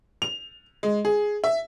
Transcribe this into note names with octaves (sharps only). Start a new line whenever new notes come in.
F7
G#3
G#4
E5